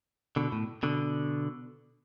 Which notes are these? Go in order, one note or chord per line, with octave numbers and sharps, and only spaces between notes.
B2 D3
A2
B2 D3